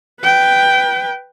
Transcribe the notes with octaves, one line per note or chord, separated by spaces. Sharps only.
B4 G5